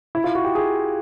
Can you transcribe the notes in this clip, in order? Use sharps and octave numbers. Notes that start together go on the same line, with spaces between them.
E4
F4
F#4
G4
G#4